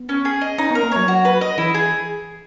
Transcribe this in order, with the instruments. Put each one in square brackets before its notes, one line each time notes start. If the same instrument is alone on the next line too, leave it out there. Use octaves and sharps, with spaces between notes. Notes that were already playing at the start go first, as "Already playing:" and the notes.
Already playing: [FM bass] B3
[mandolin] C#4
G#4
D#5
[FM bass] C#4 [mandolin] D#4
[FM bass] B3
[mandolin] A#4
[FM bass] A#3
[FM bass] F#3 [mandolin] C#5
[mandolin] F#4
B4
D#5
[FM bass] E3 [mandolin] E4
[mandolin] G#4